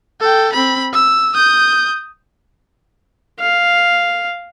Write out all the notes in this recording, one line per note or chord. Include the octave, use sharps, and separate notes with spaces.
A4 G5
C4 B5
E6
D#6 G6
F5